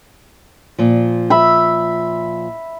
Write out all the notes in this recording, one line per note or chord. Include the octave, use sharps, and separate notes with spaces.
A#2 F3
E5 B5